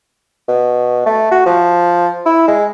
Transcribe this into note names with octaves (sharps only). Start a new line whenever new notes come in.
B2
A3
F#4
F3
E4
G#3